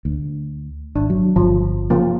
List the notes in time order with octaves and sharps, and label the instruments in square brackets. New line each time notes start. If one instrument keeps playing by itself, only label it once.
[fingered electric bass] D2
[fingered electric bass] G#1 [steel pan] D4
[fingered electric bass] F#3
[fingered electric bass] G1 [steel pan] F3
[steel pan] C#3 F3 A#3